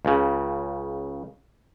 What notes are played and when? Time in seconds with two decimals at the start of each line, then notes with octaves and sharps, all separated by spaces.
0.05 C#2 C#3